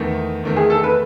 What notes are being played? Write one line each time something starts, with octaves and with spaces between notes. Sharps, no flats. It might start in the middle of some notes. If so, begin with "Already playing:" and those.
Already playing: E2 D#3 A3
E2 D#3 A3
G#4
A4
B4